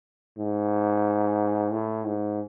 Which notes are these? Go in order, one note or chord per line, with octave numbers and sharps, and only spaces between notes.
G#2
A2
G#2